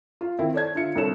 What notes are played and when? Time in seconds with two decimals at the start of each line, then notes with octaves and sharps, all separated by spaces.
0.21 F4
0.39 D#3 C4 E4
0.53 A4 C#5 D5 A5 G#6
0.75 D3 F4 E5 C#7
0.95 C2 D3 A4 C#5 E7